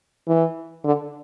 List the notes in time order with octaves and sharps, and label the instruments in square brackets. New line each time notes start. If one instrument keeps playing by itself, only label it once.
[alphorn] E3
D3